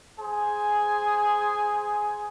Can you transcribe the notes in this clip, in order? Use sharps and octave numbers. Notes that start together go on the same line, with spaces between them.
G#4 C5 G#5